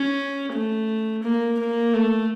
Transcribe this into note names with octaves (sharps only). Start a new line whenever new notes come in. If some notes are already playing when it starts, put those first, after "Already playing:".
Already playing: C#4
A3
A#3
A#3
A3